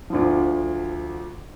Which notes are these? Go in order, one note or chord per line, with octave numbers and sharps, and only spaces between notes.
D2 D3 F3